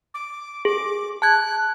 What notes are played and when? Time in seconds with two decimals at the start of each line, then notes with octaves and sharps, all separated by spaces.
0.14 D6
0.65 G#4 D6
1.22 A5 F#6 G#6